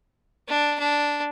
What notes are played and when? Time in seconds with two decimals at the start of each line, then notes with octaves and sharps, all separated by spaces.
0.48 D4
0.79 D4